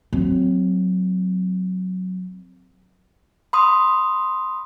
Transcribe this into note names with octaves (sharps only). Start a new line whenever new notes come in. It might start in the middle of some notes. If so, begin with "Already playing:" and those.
F#3 C4
B5 C6 D#6